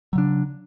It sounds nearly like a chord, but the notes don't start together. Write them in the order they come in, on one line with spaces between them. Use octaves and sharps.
F#3 C#3 D4